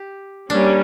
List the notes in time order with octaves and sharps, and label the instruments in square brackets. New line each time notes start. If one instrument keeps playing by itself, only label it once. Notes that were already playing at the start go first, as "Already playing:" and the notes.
Already playing: [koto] G4
[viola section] G3 A#3 C#4 [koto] D4